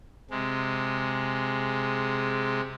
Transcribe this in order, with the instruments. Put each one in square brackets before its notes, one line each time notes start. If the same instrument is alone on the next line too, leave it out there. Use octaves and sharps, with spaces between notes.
[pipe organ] C3 G#3